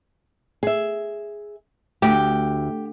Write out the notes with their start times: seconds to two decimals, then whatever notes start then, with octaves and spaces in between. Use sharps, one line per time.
0.63 G#4 E5
2.02 D2 G4